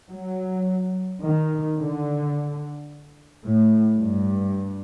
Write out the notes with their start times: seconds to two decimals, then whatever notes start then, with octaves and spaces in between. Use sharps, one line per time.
0.12 F#3
1.23 D#3
1.78 D3
3.43 A2
3.99 G2